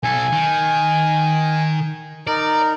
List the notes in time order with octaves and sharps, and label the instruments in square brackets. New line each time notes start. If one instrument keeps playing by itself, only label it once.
[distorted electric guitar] B1 A4 [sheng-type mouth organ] G#5
[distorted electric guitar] D#3
[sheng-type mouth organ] D#4 A#4 [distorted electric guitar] D5